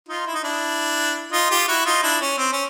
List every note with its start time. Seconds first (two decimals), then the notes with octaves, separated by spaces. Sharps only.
0.08 D#4 F4
0.27 E4
0.34 D#4
0.43 D4 E4
1.32 D#4 F4
1.50 F4 G4
1.68 E4 F#4
1.86 D#4 F4
2.03 D4 E4
2.21 C#4
2.38 C4
2.52 C#4